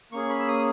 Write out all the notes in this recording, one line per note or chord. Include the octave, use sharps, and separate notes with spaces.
A#3 C#4 G#4 C#6
B5
E6
D#6